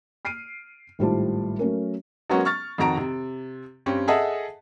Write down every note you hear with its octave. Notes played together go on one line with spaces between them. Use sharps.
F6 C7 D7 D#7
G#1 A2 G3 F4 C5 A5
F#3 A3 C#4 A#4
F#3 G#3 A#3 B3 C#4 F#4
C#6 F6 A6
F2 D#3 F#4 A#5 D7
C3
G2 C4 C#4
G#4 A4 D#5 E5 F#5 A5